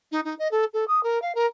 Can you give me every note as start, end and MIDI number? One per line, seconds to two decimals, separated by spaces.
0.12 0.21 63
0.25 0.35 63
0.39 0.48 75
0.51 0.65 69
0.74 0.85 69
0.88 1.03 87
1.03 1.21 70
1.22 1.33 77
1.35 1.46 70